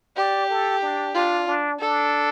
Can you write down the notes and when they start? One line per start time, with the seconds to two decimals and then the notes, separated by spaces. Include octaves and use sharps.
0.17 G4 D5
0.50 A4
0.82 D4
1.15 D4 F4
1.48 D4
1.79 D4 A4